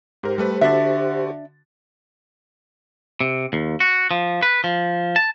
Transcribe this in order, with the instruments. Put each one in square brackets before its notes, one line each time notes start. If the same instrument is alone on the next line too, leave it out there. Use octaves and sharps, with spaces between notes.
[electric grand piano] G#2 A#4 [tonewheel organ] G4 C5
[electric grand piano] G3 A3 B4
[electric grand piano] D3 F#4 A6 [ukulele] D4 E5
[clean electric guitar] C3
D#2
F#4
F3
B4
F3
A5